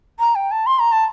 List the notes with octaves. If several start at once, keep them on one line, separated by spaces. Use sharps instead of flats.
A#5
G5
A5
C6
A#5
A5